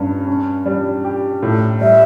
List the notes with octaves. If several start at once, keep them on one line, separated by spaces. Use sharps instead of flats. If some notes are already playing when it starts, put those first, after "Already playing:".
Already playing: G2 C#4
C#4
G3
G4
A2
G3 E5